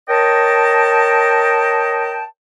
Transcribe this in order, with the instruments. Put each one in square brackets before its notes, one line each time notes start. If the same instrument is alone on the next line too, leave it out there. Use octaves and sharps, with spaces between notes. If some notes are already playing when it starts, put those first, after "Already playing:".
[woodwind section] A#4 C#5 D#5 G5 A5